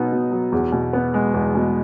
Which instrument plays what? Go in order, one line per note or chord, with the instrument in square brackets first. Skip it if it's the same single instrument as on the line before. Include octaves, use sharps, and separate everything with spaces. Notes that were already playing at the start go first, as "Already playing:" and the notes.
Already playing: [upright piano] B2 F#3 B3 D#4
B2
F#3
E2
B2
B3
G#3
E2
B2